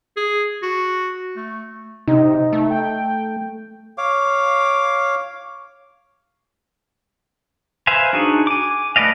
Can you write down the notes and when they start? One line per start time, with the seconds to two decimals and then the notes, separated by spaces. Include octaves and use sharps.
0.16 G#4
0.62 F#4
1.36 A3
2.08 C3 D#4
2.53 A3
2.70 G5
3.98 C#5 F5 D6
7.87 B4 C5 E5 F5 G#5
8.13 D4 D#4 F#4 G#4
8.47 G#5 D6
8.96 A3 B4 D5 D#5 F5